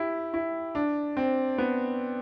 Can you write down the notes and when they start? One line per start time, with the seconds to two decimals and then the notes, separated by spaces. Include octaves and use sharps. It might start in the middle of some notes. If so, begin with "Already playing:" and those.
Already playing: E4 G4
0.34 E4
0.75 D4
1.17 C4
1.58 B3